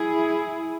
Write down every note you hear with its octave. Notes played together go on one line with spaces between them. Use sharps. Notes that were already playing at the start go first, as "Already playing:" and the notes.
Already playing: E4 G#4